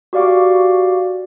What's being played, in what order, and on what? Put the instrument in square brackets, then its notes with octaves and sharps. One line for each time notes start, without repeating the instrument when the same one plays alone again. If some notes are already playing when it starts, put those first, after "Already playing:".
[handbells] F#4 G4 D5 F5 C#6 D6